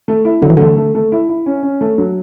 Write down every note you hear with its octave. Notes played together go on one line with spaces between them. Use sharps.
A3
E4
D3 F#3
E3
D3 A3
A3
A3
E4
E4
C#4
C#4
A3
F#3